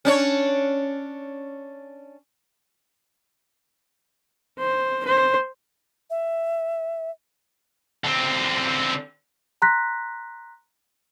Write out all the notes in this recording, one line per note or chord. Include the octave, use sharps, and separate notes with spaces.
C#4 D4 C#5
C5
C5
E5
D3 C4
A#5 C6 F#6 A#6 B6